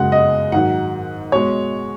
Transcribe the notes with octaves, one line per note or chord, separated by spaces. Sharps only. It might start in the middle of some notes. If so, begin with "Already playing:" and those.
Already playing: F#2 C#3 G#3 F#5
D#5
G#2 D#3 F#3 F#5
B2 G#3 C#5